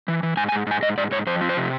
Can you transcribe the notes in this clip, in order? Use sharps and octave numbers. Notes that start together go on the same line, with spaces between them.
E3
E3
G#2 G#5
G#5
G#2
G#2 G#5
G#2 D#5
G#2 D5
G#2 C#5
F2 C5
F3
C5
C3